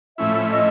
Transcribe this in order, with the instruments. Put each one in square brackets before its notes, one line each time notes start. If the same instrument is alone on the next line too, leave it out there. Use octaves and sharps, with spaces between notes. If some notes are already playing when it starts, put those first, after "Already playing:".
[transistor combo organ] A2 F3 A3 C#4 E4 [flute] E5
[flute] D#5